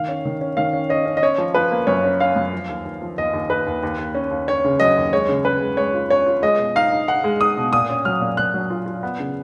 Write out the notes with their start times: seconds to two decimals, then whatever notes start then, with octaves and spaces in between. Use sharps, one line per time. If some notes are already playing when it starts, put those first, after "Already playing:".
Already playing: D#3 F5
0.09 C#4
0.25 D#3
0.41 C#4
0.57 D#3 F5
0.73 C#4
0.89 C#4 D#5
1.06 C#4
1.17 D#5
1.23 C#4 C#5
1.38 F3
1.54 F3 B4
1.72 A#3
1.87 F#2 C#5
2.04 C#4
2.20 C#4 F5
2.36 F#2
2.53 F3
2.69 D#2
2.85 D#2
3.02 F3
3.17 D#2 D#5
3.33 D#2
3.49 D#2 B4
3.67 D#2
3.83 D#2
3.98 D#2
4.15 C#4
4.31 D#2
4.48 C#4 C#5
4.64 C#3
4.80 F#3 D#5
4.97 D#2
5.12 G#3 C#5
5.28 C#3
5.45 C#3 B4
5.62 G#3
5.77 G#3 C#5
5.94 F4
6.10 C#4 C#5
6.26 F4
6.42 G#3 D#5
6.59 B2
6.76 D#4 F5
6.92 D#4
7.08 D#4 F#5
7.24 G#3
7.41 D#4 D#6
7.57 B2
7.72 A#2 D#6
7.90 C#4
8.05 F#3 F6
8.21 A#2
8.37 A#2 F#6
8.54 F#3
8.70 F4
8.86 F4
9.03 B3
9.19 C#3